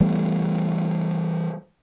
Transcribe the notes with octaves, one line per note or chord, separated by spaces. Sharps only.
E3 G3 A3 B3